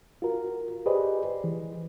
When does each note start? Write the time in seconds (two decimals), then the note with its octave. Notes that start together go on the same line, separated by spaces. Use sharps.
0.22 F4 F#4 A#4
0.86 G4 G#4 B4 C5 D5 D#5
1.44 E3